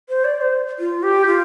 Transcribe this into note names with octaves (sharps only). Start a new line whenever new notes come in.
C5
D5
C5
F4
G4
F4